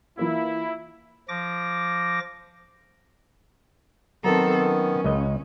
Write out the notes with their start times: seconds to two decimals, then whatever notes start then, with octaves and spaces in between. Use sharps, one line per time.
0.17 E3 A#3 E4 F4
1.28 F3 D6 A#6
4.24 D#3 F#3 B3 C4 A4 A#4 A5 A#5
4.65 C#4
5.04 C#2 D#5